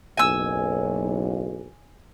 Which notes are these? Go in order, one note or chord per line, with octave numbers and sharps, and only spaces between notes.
F#1 B1 G#5 E6